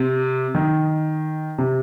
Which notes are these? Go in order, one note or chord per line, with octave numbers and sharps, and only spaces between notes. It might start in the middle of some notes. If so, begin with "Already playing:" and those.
Already playing: C3
D#3
C3